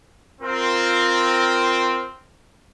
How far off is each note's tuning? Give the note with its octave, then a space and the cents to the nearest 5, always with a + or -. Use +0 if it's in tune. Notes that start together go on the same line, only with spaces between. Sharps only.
C4 +0 F4 +0 A#4 +0